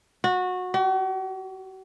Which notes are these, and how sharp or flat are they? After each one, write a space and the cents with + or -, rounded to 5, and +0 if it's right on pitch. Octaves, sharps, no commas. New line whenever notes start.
F#4 -20
F#4 +45